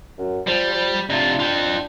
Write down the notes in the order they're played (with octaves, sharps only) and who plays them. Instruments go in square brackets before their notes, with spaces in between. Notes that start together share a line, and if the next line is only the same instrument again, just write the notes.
[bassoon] F#2
[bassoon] F3 [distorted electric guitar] G3
[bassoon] F3
[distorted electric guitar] C3 F4 [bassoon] D4
[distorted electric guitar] F4 G5